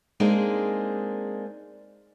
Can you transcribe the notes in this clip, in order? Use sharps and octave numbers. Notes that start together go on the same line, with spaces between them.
G#3 A#3 C4 D4 D#4 G#4